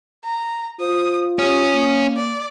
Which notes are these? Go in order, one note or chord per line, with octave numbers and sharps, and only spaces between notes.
A#5
F4 C5 D#6
C#4 G4 D#6
A#3
D5